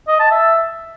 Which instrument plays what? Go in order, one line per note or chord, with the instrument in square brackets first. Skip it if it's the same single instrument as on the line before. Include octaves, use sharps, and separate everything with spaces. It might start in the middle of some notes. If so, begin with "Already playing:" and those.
[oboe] D#5
A5
E5